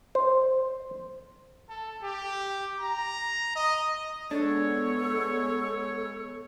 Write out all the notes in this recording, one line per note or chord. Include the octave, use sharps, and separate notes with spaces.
C5
A4
G4
A#5
D#5
G#3 B3 D4 A4 C#5